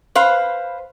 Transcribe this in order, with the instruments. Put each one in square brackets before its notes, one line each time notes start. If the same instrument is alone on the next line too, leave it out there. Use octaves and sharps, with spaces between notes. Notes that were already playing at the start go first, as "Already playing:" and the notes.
[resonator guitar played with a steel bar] B4 C5 F5